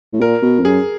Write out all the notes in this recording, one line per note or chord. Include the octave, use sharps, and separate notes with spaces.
A2
A#2 A#4
B2
F2
F#2 G#4